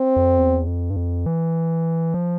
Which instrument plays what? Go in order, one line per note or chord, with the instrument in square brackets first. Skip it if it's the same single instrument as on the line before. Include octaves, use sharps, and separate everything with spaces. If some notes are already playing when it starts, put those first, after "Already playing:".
Already playing: [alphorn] C4
[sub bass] F2
E2
F2
G2
F2
E3
F3